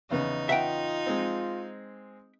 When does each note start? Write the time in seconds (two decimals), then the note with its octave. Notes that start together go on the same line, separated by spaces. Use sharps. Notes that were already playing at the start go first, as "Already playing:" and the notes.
0.11 E2 C#3 B3 D#4
0.49 F4 E5 F#5 G5
1.06 G#3 C4